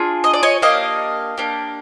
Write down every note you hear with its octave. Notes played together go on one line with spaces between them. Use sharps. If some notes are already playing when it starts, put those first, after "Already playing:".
Already playing: D4 F4 G#4
D#5
D5
C#5 D#5
A#3 D4 G4 D#5 F5
A#3 D4 G4